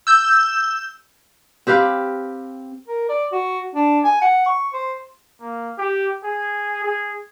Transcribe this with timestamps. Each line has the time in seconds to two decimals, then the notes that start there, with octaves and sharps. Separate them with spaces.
0.07 E6 G6
1.67 C4 G4 B4 F5
2.87 A#4
3.09 D5
3.32 F#4
3.75 D4
4.04 G#5
4.22 F#5
4.46 C#6
4.73 C5
5.41 A#3
5.78 G4
6.24 G#4
6.84 G#4